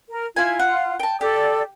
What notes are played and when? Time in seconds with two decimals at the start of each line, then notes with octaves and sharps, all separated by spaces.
0.09 A#4
0.36 E4 F4 G#5
0.59 F#5
1.00 G5 A5
1.21 G4 A4 D5